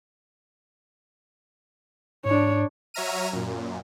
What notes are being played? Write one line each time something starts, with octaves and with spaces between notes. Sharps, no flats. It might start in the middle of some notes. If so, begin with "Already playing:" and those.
G#2 D4 C#5
F#3 C#5 E5 A#5 F6 D#7
F#2 A#2